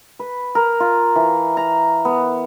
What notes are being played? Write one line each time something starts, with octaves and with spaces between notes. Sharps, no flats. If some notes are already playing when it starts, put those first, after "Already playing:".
B4
A#4
F4
E3
A#5
B3